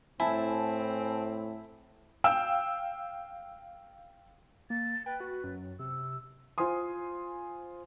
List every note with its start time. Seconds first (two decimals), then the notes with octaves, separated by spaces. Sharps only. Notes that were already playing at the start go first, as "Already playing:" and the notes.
0.20 A2 C4 E4 G#5 A5
2.24 F5 G5 E6
4.70 A#3 A6
5.06 B4 G5
5.20 F#4
5.44 F#2
5.80 C3 E6
6.58 F4 C5 G#5 C6 D#6